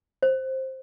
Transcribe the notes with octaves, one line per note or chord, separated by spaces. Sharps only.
C5